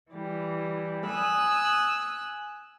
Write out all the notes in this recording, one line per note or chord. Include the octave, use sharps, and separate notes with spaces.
E3 G3
G#5 D#6 E6 F#6